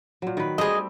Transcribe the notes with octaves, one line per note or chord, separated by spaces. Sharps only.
A#2 F#3
D#3 B4
G3 A3 C4 G#4 D#5